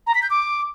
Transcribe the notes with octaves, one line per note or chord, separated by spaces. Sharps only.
A#5
B6
G6
D6